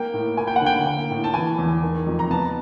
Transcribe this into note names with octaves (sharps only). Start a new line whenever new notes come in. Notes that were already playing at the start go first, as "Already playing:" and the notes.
Already playing: A#3 G5
A2
A#3 G#5
G5
F#5
D3 G5
A#3
A2
A5
E3 G#5
E2
D#3
F2
A#5
B3 A5